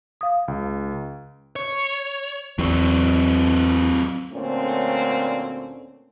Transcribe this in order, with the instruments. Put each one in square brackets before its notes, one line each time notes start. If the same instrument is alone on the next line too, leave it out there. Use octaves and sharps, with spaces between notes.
[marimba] F5 D#6
[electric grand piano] C#2
[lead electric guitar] C#5
[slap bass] E2 [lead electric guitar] F#3 C4
[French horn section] D2 A#2 D3 A3 C4 C#4